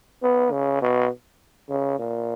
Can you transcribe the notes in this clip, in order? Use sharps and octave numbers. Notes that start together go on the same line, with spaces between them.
B3
C#3
B2
C#3
A#2